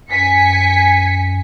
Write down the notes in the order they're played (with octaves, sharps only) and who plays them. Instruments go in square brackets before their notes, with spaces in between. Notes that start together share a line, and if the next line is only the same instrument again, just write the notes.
[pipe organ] F#2 [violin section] G#5 B6 C#7